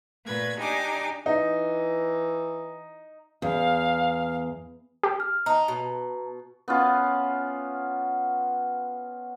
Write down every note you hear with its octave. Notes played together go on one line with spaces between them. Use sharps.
A#2 A3 B4 G#6
D4 D#4 G4 G#5 D6
E3 D#4
E2 F5
G4
F6
D#4 A5 A#5
B2
B3 C#4 F4